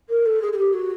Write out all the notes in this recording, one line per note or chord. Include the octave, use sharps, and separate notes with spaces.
A#4
A4
G#4
G#4
G4
F#4